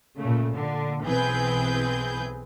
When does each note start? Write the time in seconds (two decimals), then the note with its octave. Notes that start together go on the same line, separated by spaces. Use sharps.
0.18 A#2 C#3 A3
0.54 A#2 D3
1.04 B1 E3 C4 G#4 B4 G6